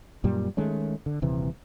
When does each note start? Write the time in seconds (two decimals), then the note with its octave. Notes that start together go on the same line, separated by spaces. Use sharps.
0.24 F#2 A#2 G3
0.57 D#3 G#3 A3 C#4
1.06 D3
1.22 D#1 C3 E3